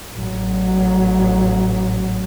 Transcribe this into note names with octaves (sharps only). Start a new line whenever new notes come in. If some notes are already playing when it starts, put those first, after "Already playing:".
A1 F#3